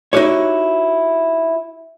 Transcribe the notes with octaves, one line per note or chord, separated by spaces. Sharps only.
D#4 E4 F#4 G4 C#5